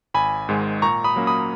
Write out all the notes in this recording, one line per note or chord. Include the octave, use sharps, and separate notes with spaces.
G#1 G#5 B5
G#2 D#3 G#3
A#2 A#5 C#6
B5 D#6
F#3 A#3 C#4
B5 D#6